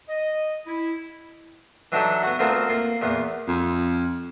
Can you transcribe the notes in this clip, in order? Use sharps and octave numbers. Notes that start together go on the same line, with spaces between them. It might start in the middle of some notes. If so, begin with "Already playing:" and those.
D#5
E4
E3 F#3 D4 D#4 G4 A4
B3 F#4
D2 B3 C4 F4 A#4 A5
A#3 F4
E2 A#2 B3
F2